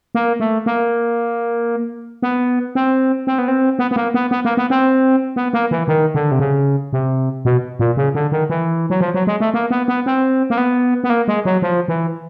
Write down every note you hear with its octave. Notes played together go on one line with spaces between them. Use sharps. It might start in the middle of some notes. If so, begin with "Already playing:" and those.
A#3
A3
A#3
B3
C4
C4
B3
C4
B3
B3
A#3
B3
B3
A#3
B3
C4
B3
A#3
E3
D#3
D3
C3
C#3
C3
B2
A#2
C#3
D3
D#3
E3
F#3
F3
F#3
G#3
A3
A#3
B3
B3
C4
A#3
B3
B3
A#3
G#3
F#3
F3
E3